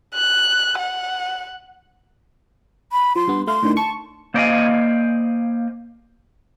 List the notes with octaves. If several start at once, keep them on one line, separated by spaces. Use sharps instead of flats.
F#6
F#5
B5
F3 C6
G2 B3
A3 F5 C6
A2 D3 D#3
A5 C#6
A#3 C5 D5 D#5 F5 G#5